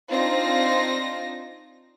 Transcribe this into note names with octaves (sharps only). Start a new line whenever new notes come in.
C4 D4 D#4 F4 A#6